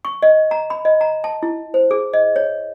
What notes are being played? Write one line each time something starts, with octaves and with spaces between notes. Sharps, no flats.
C#6
D#5
A#5
B5
D#5
A#5
A5
E4
C5
G#4
D#5
C#5